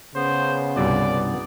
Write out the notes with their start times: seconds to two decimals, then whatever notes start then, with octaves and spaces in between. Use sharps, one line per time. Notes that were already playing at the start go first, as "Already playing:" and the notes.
0.15 C#3 B3 C5
0.76 C2 G2 B2 D5